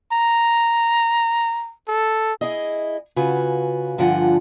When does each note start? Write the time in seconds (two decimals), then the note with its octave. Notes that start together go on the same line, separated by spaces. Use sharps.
0.12 A#5
1.87 A4
2.41 E4 G#4 D#5
3.16 C#3 F4 F#4 B4 G#5
3.98 G2 D3 F3 F4 F#5 G#5